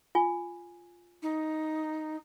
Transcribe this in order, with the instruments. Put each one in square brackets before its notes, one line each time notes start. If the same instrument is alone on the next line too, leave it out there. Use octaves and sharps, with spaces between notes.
[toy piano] F4 G#5
[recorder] D#4